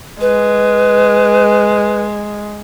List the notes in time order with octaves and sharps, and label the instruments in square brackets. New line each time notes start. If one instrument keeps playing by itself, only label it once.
[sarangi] G#3 [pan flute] B4